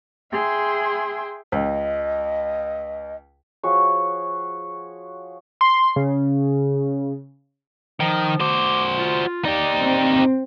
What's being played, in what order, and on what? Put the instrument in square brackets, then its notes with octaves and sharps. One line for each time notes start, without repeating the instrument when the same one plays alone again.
[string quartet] G#4 E5 G5 C6
[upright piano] C#2 [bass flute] D#5
[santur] F3 F#4 G#4 C#5
[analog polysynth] C6
C#3
[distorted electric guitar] D#3 [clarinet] F3
[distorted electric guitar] F#4 C5 [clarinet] D6
[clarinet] F4
[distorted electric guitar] D#4 G4 [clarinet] D5
[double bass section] C4